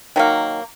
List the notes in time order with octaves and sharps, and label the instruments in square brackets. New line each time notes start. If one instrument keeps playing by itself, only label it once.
[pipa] D#3 F#3 A#3